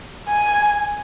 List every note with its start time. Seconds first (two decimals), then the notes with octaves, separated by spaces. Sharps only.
0.29 G#5